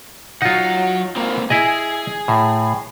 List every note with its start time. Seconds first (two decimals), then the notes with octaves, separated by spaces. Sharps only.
0.42 F#3 D#4 F4 F#5
1.16 A#3 C4
1.50 E4 G#4 D#5
2.28 A2